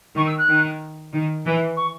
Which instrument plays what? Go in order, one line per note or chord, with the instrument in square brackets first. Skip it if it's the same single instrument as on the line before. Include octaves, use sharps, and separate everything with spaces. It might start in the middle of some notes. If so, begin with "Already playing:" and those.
[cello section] D#3 [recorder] C#6
[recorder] E6
F#6
[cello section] D#3
D#3
E3
[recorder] C#6